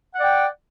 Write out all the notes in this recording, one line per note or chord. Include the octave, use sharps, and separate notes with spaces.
D5 F#5 G5